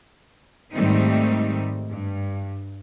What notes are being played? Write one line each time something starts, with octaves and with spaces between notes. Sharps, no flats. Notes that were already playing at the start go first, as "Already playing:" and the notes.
G#2 D#3 G3 A3 C4 D#4
G2